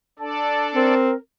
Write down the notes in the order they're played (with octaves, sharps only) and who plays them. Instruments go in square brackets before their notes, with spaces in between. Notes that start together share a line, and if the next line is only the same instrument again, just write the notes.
[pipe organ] D4 A4 D5 [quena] A5
[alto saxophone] C4 [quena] A#4